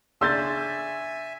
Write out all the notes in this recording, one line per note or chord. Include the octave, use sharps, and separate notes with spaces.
C#3 D4 E5 G#5 C6 E6 G6 A6